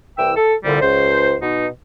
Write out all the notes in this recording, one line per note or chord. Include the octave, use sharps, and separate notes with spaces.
C2 E3 G5 E6
A4
C2 A#2 D3 G3
C#2 C5
B2 D#4